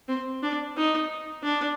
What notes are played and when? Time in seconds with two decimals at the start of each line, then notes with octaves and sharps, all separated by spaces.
0.09 C4
0.43 D4
0.77 D#4
1.43 D4